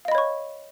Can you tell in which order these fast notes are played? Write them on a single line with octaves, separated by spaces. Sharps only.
F5 D#5 B5 C#5 C#6